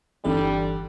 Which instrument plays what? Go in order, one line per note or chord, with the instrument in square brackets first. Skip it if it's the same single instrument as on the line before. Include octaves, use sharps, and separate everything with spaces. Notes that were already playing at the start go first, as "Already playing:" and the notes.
[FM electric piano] G1 E3 A4 [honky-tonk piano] D3 D4 [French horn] G3